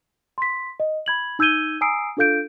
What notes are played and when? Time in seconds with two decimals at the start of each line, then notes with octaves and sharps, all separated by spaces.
0.38 C6 B6
0.80 D#5
1.06 B5 G#6 F#7
1.39 D#4 E6 G6 G#6 D#7 G7
1.81 G#5 A#5 D#6 E6 C7 D7
2.17 D4 F4 A4 F5 G6 D7